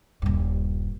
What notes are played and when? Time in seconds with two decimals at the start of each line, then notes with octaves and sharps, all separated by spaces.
0.22 D#1 G2